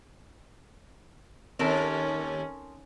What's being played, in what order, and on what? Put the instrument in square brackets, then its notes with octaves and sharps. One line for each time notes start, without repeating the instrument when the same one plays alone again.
[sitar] D#2 [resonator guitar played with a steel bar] C4 A4 A#4 [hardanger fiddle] C#4